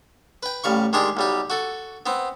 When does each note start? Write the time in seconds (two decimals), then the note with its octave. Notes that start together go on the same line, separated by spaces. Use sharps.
0.43 B4 G5
0.64 A1 G3 F5 C#6
0.93 D#3 G#3 D4 G4 G#4 C6
1.17 B1 G3 G4
1.50 F#4 A4
2.06 B3 C4